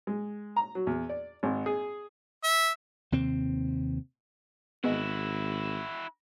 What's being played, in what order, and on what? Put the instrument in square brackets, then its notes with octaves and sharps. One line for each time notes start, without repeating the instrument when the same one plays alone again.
[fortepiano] G#3
A#5
F#3
E2
D5
G#1
G#4
[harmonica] E5
[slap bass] D#2 C3 C4
[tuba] G#1 [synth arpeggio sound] B3 G#4 D#5 [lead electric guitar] E4 F#4